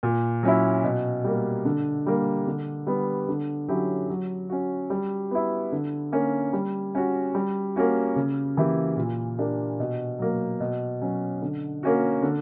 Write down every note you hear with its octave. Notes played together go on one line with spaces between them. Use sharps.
A#2
F#3 C#4 E4
B2
G3 A#3
D3
G3 A#3
D3
G3 B3
D3
F#3 C#4 E4 G4
F#3
C#4 F#4
G3
B3 E4
D3
A#3 C#4
G3
C#4 F#4
G3
A#3 C#4 F#4
C#3
E3 A#3 E4 G4
A#2
A#3 D4 G4
B2
F#3 A#3
B2
F#3 C#4
D3
A#3 C#4 F#4
D3